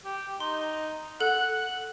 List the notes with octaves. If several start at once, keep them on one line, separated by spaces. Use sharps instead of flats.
G4
D#4 C6
A4 F#5